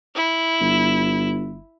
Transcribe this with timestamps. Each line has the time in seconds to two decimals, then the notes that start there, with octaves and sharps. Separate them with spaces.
0.15 E4
0.61 G1